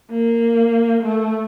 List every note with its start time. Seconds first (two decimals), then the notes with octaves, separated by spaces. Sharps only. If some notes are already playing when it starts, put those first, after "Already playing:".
0.10 A#3
1.03 A3